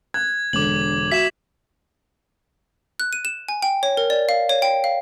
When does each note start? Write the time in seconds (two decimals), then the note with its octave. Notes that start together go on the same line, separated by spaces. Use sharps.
0.14 F#6 G#6
0.53 E1 D3 D6 F#7
1.12 F#4 E5 B6 E7
3.00 F#6
3.13 D#7
3.25 E7
3.49 G#5
3.62 G5
3.83 C#5
3.97 A#4
4.10 D5
4.29 F5
4.49 C#5
4.62 G5
4.84 F5